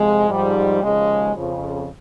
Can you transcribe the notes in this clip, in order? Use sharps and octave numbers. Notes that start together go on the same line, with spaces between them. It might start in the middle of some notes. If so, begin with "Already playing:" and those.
Already playing: F2 C3 F3 G#3
G#2 F3 G3
D#2 C#3 F3 G#3
F2 C#3 F3